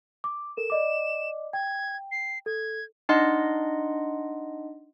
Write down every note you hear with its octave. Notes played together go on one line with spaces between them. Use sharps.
D6
A4 A#4 E7
D5 D#5 D6
G5 G#6
C7
A4 G#6
D4 D#4 D#5 F#5 C6